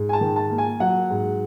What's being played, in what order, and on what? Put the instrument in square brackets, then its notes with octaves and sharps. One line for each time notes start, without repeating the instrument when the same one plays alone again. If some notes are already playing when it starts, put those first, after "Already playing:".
Already playing: [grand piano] G#2
G#5
A5
D#3
A5
A#3
G#5
F#3 F#5
G#2